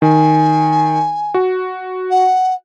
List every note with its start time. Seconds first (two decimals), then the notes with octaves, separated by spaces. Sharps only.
0.02 D#3 G#5
1.34 F#4
2.10 F#5